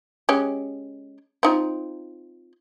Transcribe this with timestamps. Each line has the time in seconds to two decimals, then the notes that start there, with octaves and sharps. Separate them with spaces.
0.29 G#3 C#4 G4
1.43 C4 D#4 F4